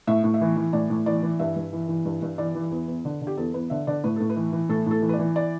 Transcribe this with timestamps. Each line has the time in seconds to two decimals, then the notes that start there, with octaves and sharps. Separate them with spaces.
0.07 A2 E5
0.24 A2
0.34 E5
0.41 E3
0.56 E3
0.73 A2 D5
0.90 A2
1.06 E3 D5
1.23 E3
1.39 G2 E5
1.56 G2
1.73 E3
1.88 E3
2.05 G2
2.22 G2
2.38 E3 D5
2.55 E3
2.71 E2
2.88 E2
3.05 D3
3.22 D3
3.27 G4
3.37 E2 A4
3.54 E2 B4
3.70 D3 E5
3.87 D3 D5
4.04 A2 B4
4.16 A2 A4
4.30 B4
4.36 E3
4.52 E3
4.69 A2 A4
4.86 A2 A4
5.02 E3
5.09 B4
5.13 D5
5.19 E3
5.36 D5